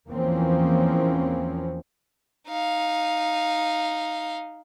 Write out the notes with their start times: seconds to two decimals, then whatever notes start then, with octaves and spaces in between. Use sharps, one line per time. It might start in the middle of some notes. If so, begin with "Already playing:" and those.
0.10 E2 E3 F3 A#3 C4 C#4
2.48 D#4 F5